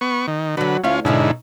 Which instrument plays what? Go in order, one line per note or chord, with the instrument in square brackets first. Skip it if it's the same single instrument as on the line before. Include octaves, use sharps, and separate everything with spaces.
[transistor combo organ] B3 C#6
D#3
[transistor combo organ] D3 B4 [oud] F#3 F#4
[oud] D2 E4 F5 [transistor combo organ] C#4 F4
[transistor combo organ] G#2 D3 E4 [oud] B2 C#4 D#4